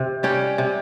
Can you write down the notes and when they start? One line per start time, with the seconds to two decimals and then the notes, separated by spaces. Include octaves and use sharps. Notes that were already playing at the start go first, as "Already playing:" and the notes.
Already playing: C3
0.23 G3 C#4 G4
0.58 C3